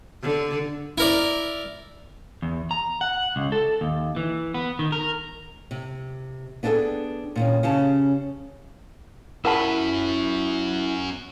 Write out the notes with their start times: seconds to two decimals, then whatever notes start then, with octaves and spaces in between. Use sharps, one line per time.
0.23 D3
0.98 E4 A#4 D5
2.42 E2
2.71 A#5
3.01 F#5
3.36 C#2
3.52 A4
3.81 D#2
4.16 E3
4.54 B3
4.79 D#3
4.92 A#4
5.71 C3
6.63 B3 D4 E4 G#4 A4 G5
7.36 A#2 D#3 C#4
7.63 C#3 C#4 G4 A5
9.45 C#4 E4 F#4 A#4 F#5 A5 B5